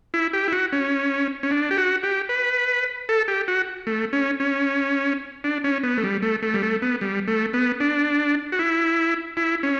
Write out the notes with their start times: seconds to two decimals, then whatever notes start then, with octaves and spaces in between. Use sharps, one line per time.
0.14 E4
0.33 G4
0.48 E4
0.52 F#4
0.73 C#4
1.43 C#4
1.51 D4
1.71 G4
1.78 F#4
2.03 G4
2.29 B4
3.09 A4
3.28 G4
3.48 F#4
3.87 A3
4.13 C#4
4.40 C#4
5.44 D4
5.64 C#4
5.83 B3
5.98 A3
6.04 G3
6.22 A3
6.42 A3
6.54 G3
6.63 A3
6.82 B3
7.01 G3
7.28 A3
7.53 B3
7.80 D4
8.52 F#4
8.59 E4
9.37 E4
9.63 C#4